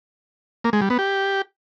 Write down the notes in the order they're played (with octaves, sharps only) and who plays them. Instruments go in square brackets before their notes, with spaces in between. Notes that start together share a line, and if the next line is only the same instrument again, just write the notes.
[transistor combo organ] A#3
G#3
G3
B3
G4